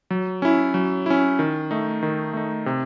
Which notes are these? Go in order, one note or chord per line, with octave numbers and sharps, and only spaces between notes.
F#3
C#4 E4
F#3
C#4 E4
D#3
A3 D#4
D#3
A3 D#4
C3